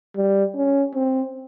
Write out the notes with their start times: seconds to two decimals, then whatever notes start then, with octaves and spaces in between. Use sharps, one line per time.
0.16 G3
0.56 C#4
0.95 C4